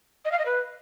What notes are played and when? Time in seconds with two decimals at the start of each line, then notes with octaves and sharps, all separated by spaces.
0.25 D#5
0.32 F5
0.39 D#5
0.46 B4